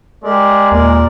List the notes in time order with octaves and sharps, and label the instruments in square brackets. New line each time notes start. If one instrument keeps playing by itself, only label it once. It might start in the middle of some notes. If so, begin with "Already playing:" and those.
[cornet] G#3 [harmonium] G4 A#4 D5
[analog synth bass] D#2 [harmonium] A#2 A#4 D5